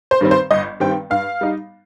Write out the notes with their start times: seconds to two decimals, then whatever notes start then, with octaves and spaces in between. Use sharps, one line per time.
0.11 C5
0.21 G2 D#3 G3 C4
0.31 C5
0.51 G1 D#5
0.80 G2 D#3 G3 C4 G5
1.10 G2 F5
1.41 G3 D#4